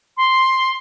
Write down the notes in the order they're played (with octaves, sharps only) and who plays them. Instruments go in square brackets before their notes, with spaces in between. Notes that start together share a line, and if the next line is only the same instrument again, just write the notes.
[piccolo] C6